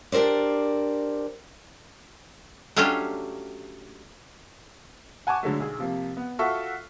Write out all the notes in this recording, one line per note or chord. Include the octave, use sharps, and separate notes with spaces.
D4 G4 A#4 C5 D5
F#3 A3 C#4 D4 F4 G4
F#5 G#5 A5 C#6 D6
D3 F#3 G#3 A3
B1 G#4
C3 F3 A#3
B3
F4 F#4 A4 E5 C#6